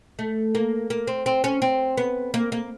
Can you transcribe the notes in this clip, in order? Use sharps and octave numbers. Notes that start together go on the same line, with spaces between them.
A3
A#3
A#3
C4
C4
C#4
C4
B3
A#3
A#3